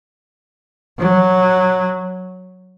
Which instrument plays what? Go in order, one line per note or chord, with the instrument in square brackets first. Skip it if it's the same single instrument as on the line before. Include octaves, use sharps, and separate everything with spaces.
[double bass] F#3